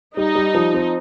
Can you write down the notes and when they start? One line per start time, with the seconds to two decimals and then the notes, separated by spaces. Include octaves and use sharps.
0.16 G3 D#4
0.35 G3
0.54 F3
0.74 C4